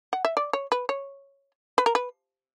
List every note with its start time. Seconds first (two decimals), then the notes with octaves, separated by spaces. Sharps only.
0.13 F#5
0.25 E5
0.37 D5
0.53 C#5
0.72 B4
0.89 C#5
1.78 B4
1.86 A#4
1.95 B4